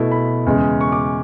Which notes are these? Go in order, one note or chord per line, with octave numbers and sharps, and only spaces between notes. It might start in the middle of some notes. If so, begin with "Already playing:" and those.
Already playing: B2 A3 E4
B5
E2 C#3 G#3
C#6
D6